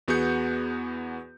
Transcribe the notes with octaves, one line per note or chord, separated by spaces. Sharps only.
E2 B3 F#4 G#4 G6 C#7